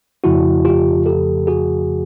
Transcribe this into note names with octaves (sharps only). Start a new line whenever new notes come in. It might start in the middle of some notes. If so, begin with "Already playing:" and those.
F2 C#3 F3 A3 E4 F#4
F4 G4
G4 A4
F#4 G#4